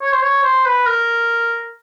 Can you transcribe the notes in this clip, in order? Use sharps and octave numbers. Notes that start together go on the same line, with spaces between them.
C#5
C5
C#5
C5
B4
A#4